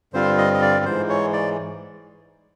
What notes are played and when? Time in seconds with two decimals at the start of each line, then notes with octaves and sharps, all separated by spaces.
0.13 G2 D3 G3 C4 F4 C5
0.38 D#5
0.54 D#5
0.62 D5
0.85 G#2 E3 G#3 C5
1.09 C#5
1.33 D5